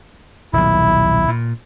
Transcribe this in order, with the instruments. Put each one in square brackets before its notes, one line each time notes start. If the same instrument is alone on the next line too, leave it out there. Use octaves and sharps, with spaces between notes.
[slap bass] D#1 B1 [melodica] E4
[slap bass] A#2